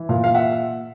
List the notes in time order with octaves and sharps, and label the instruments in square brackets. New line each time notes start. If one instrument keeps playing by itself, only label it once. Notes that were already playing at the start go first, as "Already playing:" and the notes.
Already playing: [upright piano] E3
A#2 F5
F5
E5 F#5